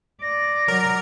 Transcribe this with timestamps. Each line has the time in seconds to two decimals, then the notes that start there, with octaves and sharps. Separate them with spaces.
0.22 D5 A#6
0.68 F#3 A#4